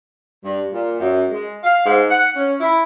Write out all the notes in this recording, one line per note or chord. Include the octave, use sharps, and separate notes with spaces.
G2
A#2
F#2
G#3
F5
G#2
F#5
C#4
E4